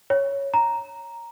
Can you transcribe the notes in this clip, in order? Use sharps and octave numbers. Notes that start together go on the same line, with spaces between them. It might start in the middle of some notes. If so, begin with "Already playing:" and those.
C#5
A#5